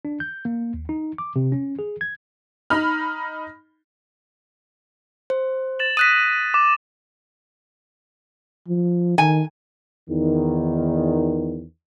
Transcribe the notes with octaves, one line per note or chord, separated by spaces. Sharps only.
D4
G6
A#3
D#2
D#4
D6
C3
C#4
G#4
G#6
D#4 B5 F6
C5
A6 E7 F#7
D#6 F#6 A#6 B6 D#7
D6 E7
F3
D#3 G#5
E2 D#3